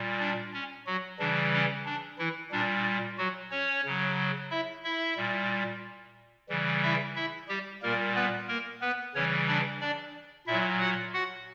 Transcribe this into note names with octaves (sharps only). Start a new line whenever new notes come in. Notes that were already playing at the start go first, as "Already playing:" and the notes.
Already playing: A#2 G3
D4
C#4
F#3 F#4
C#3 E3 G3 D4
C#4
D4
E3 E4
A#2 G3 D4
F#3 F#4
C#4 C#5
C#3 F#3
E4 E5
E4 E5
A#2 G3
C#3 E3 G3
E4 E5
E4 E5
G3 G4
A#2 G3 A#3 A#4
B3 B4
A#3 A#4
B3 B4
C#3 E3 G3 C#4 C#5
D4 D5
D4 D5
A#2 F#3 E4 E5
F#4 F#5
F#4 F#5